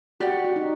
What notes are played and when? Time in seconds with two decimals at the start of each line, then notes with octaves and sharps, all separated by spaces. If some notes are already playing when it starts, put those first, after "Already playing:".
0.20 F#4 G4 D5 F#5
0.44 F#4
0.56 D#4